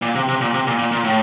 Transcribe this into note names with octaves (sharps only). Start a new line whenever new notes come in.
A#2
C3
C3
A#2
C3
A#2
A#2
A#2
A2